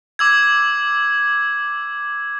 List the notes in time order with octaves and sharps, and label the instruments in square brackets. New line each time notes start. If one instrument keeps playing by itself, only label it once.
[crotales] D6 E6 G#6